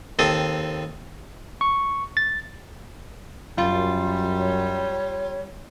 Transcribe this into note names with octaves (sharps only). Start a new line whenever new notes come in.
D#2 C4 A4 D#6
C#6
A6
F#2 G3 F4
C#5